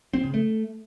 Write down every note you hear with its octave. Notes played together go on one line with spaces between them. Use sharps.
C4
C#3
A3